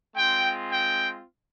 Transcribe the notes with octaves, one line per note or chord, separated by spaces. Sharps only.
G#3 C4 F4 G5
G5